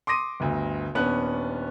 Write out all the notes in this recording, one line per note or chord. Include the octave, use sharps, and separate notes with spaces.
C6 D6 D#6 A#6 D#7
G1 D2
D#1 B3 C#4 D4 F#6